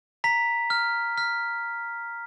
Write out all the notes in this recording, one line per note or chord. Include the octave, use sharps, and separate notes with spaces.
A#5 B6
F6
F6 B6